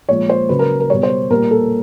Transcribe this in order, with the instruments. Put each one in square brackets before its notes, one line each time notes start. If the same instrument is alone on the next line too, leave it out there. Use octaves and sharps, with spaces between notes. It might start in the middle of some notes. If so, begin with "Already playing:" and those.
[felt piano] A#2 F3 G#3 C#5
C5
C#3 F#3 B4
A#4
A#4
B2 G3 C#5
C5
A#2 G3 A#4
A4